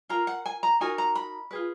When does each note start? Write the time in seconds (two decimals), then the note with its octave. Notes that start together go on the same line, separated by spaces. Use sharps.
0.09 F4 A#4 A#5
0.27 F#5
0.46 G#5
0.63 A#5
0.81 D#4 F#4 A#4 G#5
0.98 A#5
1.15 B5
1.51 F4 G#4 B4